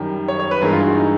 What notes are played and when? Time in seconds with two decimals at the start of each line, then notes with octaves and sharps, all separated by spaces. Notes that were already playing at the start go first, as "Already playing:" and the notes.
Already playing: F#2 D#3 G3
0.28 C#5
0.40 C#5
0.51 B4
0.61 G2 E3 G#3 A#4
0.73 F4
0.84 F#4
0.95 D#4